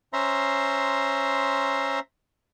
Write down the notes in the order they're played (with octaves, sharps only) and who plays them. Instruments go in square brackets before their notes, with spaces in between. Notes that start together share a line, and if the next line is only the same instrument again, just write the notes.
[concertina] C#4 C5 E5 A#5 C6